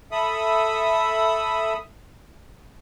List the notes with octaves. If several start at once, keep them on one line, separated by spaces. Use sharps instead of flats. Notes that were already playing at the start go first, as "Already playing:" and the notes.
A4 E5 B5 D#6